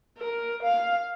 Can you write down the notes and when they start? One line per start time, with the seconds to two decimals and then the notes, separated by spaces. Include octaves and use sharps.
0.18 A#4
0.63 F5